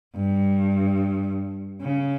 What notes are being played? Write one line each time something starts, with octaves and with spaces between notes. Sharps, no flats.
G2
C#3